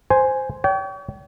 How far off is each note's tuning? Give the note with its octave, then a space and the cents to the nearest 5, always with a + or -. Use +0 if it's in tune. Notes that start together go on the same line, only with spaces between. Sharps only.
C5 -5 G#5 +0
C#5 +40 G5 -25